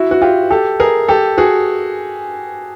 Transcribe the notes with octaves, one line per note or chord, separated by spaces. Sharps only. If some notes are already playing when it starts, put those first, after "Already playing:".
Already playing: E4 F#4
F#4
F4 G4
G4 A4
G#4 A#4
G4 A4
F#4 G#4